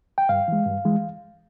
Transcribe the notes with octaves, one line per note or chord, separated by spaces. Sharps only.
G5
G2 F5
E3 G#3
G2
E3 G#3